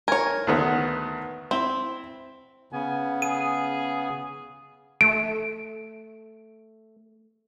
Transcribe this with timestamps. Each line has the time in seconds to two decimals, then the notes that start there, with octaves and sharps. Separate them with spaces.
0.08 A#4 C#5 G#5
0.47 D2 D#3 B3
1.51 C4 E4
2.73 C#3 B3 G#5
3.22 G#4 D#7
5.01 A3 D7